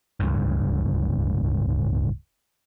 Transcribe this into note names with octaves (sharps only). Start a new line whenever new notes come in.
D1 C#2 G2